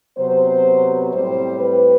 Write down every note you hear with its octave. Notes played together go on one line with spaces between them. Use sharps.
C3 F#3 B3 C5
A2 G3 C4 C5
B4